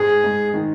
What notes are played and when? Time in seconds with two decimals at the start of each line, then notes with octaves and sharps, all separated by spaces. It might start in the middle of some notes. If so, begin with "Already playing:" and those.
Already playing: G#2 G#3 G#4
0.24 G#2
0.54 D#3